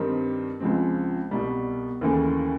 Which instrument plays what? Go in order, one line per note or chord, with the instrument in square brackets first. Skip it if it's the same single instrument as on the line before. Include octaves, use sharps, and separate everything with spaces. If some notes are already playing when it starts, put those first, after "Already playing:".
Already playing: [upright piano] G2 D#3 G3 C4 D#4
C#2 C#3 F3 G#3 C4
C2 B2 G3
D#2 C#3 E3 A3